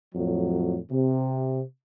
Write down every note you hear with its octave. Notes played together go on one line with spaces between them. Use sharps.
F2 A2 F#3
C3